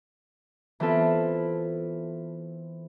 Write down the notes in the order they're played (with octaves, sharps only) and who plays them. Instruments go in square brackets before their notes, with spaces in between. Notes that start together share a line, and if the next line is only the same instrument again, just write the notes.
[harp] E3 B3 C4 F4 A4 B4